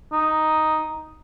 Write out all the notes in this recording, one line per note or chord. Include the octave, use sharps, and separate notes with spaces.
D#4